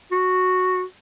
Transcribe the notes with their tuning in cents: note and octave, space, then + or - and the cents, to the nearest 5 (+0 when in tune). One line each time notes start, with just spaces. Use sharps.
F#4 -5